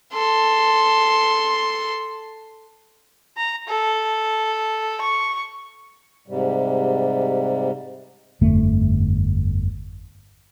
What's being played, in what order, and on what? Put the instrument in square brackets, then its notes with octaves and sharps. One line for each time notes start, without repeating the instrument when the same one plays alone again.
[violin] A4 C6
[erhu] A#5
A4
C#6
[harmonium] G#2 C3 G3
[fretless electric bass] G1 F2 D3 A3